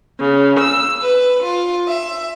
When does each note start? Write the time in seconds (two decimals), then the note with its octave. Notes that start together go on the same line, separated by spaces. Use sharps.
0.19 C#3
0.60 E6
1.00 B4
1.41 F4
1.86 E5